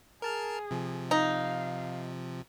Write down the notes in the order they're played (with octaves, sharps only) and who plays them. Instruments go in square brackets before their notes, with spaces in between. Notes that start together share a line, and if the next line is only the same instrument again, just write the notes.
[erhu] G#4 [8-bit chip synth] A#4 A5 F6
[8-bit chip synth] C3 F3
[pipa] D#4 [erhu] F5